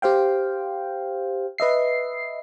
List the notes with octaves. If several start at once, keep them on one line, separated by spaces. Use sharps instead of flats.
G4 C5 F5 G5
B4 D#5 E5 C7